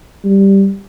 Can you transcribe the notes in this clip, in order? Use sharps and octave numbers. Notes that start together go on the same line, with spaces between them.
G3